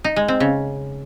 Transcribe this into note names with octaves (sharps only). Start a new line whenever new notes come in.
D#4
G#3
C4
C#3